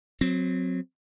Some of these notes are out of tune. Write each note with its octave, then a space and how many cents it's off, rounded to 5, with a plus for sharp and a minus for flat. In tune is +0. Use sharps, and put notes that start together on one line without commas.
F#3 -20 C4 -5